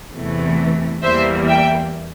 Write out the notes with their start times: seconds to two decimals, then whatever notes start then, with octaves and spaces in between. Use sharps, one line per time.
0.12 E2 C3 E3 A3
1.03 E2 E3 G3 A#3 C5 E5
1.48 E5 G5